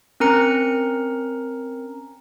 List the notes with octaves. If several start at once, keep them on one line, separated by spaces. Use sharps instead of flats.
C4 C#4 A#4 A#5 C#7